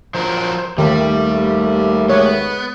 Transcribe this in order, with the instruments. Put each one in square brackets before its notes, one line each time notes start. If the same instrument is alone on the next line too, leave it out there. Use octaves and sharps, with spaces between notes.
[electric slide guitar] F3 F#3 A#4 [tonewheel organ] C5
[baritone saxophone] D#2 [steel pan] D#3 [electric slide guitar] G3 [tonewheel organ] A3
[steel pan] G#3 C#5 [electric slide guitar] B3